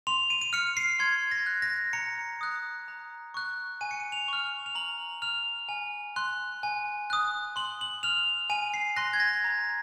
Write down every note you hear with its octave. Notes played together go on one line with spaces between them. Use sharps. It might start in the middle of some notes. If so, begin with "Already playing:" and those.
C6 F7
D#7
D#7
F6 C#7
C7
C6 G#6
A#6
F#6
A#6
A#5 C#7
D#6 F#6
A#5
C#6 F#6
G#5 D#7
C#7
D#7
F7
C#6 F6
F7
A#5 F#7
F6 F7
G#5
C6 F#6
G#5
D#6 F#6
C6 F#7
F#7
F6 F7
G#5 D#7
C7
C6 F#6 A#6
G#6
A#6
A#5